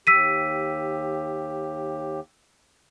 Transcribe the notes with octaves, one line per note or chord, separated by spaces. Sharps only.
D#2 G4 E6 B6 D#7